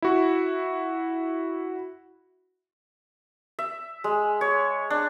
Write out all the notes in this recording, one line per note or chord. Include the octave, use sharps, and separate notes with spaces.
E4 F#4
E5
G#3
C#5
D4